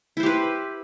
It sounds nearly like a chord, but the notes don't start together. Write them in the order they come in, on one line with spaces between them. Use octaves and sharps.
E4 C5 G4 B4